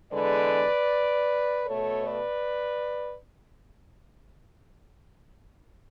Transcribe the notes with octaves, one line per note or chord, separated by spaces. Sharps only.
E2 D3 G#3 B4 D5
B2 A3 A4 C#5
B4 D5